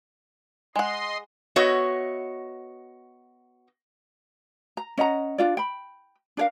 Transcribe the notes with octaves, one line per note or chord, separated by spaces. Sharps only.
G#3 D#5 F#5 C6
B3 F#4 C#5 D#5 E5
A#5
C#4 D#5 F#5 A#5
D4 F4 D5
G5 B5
D4 A4 A#4 F5